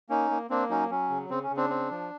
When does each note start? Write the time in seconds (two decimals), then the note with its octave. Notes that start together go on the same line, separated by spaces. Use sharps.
0.09 A#3 C#4 D#4
0.31 A#3
0.50 A#3 C4 D4
0.69 F#3 C#4 D#4
0.90 F#3 C#4
1.10 C#3
1.30 C#3 C4
1.43 C#4
1.50 C#3
1.57 C4 D4
1.70 C4
1.91 F3